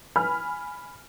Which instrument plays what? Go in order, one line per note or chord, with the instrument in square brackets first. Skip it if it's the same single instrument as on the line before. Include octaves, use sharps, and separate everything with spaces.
[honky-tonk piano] G#5 B5 F6